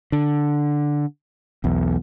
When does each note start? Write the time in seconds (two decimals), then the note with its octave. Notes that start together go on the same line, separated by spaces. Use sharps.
0.12 D3
1.64 B1 E2